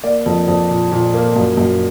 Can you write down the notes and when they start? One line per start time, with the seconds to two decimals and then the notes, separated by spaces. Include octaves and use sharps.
0.04 A#3 D5
0.26 F2
0.48 F2
0.70 A#2
0.92 A#2
1.14 A#3
1.36 F#2
1.57 F#2